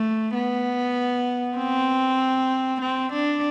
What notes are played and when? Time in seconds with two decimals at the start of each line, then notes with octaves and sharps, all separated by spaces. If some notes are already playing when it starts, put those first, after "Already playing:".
Already playing: A3
0.34 B3
1.58 C4
2.81 C4
3.13 D4